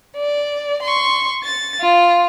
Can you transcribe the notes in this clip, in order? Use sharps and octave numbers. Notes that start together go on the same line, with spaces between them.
D5
C6 C#6
A6
F4